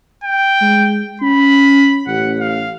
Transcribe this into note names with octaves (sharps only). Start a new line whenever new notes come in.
G5
G#3
C#4 B5
A1 F#5
F5